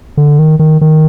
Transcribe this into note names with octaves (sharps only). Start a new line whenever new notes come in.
D3
D#3
D#3
D#3